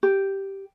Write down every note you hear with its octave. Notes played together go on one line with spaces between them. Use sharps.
G4